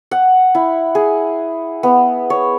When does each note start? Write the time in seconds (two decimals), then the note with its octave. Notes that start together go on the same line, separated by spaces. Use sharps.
0.11 F#5
0.55 E4
0.95 G#4
1.83 B3
2.30 C#5